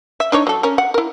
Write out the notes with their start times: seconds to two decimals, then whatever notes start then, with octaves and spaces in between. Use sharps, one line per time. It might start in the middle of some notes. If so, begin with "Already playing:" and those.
0.20 E5
0.32 D4 D#4 C#5
0.47 F#3 A4
0.63 C#4 A#4
0.78 F#5
0.94 E4 A#4